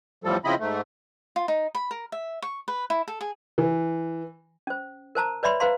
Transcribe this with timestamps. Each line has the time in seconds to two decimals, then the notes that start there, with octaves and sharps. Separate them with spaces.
0.24 E2 A2 F3 G3 A4
0.45 C#3 F3 C4 E4 D#5 B5
0.60 G#2 A3
1.36 F4
1.48 D#4
1.75 B5
1.91 A#4
2.12 E5
2.42 C#6
2.68 B4
2.90 E4
3.08 A4
3.21 G#4
3.58 E3
4.67 C#4 C5
5.15 A#4 C5 A5 A#5
5.43 B4 C#5 D5 E5 B5 C6
5.60 B4 C5 F5 A#5 C6